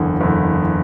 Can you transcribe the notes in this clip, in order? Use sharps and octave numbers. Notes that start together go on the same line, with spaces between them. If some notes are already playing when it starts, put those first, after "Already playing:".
Already playing: F#1 E2 D3
F#1 E2 D3